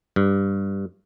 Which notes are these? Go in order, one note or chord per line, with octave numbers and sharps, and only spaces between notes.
G2